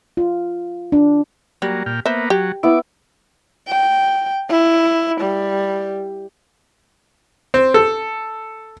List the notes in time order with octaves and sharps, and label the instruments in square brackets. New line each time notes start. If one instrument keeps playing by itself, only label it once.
[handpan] F4
D4
[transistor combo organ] F#3 A#3 [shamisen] G3
[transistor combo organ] A#2 G5 F6
[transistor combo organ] A#3 B3 [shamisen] C5 E5
[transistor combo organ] F#3 [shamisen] G4
[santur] B3 E4 [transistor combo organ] D6
[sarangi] G5
E4
G3
[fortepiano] C4
A4